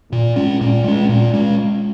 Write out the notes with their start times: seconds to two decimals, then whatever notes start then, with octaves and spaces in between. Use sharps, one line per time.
0.12 A#2
0.36 G#3 C#4
0.61 A#2
0.84 G#3 C#4
1.09 A#2
1.34 G#3 C#4